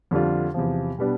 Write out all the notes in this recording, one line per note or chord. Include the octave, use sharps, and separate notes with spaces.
F2 D3 G3 D4 F4
E2 C3 F3
B2 G3 B3 D4